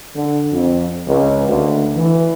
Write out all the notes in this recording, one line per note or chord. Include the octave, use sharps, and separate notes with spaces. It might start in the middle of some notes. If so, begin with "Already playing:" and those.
D3
F2
C#2
D2
E3